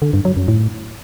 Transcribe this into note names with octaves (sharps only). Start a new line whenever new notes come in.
D3
G2
F#3
F#2
A2